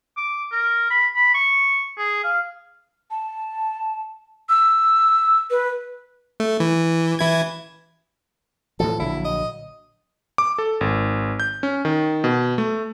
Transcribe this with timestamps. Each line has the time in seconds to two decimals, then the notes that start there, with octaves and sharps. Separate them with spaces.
0.17 D6
0.52 A#4
0.91 B5
1.16 B5
1.35 C#6
1.98 G#4
2.24 F5
3.11 A5
4.49 E6
5.50 B4
6.40 A3
6.60 E3
7.19 E3 E4 G#6
8.80 A2 E3 F3 A4
8.99 A#1 D3 F#3 E4
9.25 D#5
10.38 D6
10.58 A4
10.81 G#1
11.40 G6
11.63 C#4
11.85 D#3
12.24 B2
12.58 A3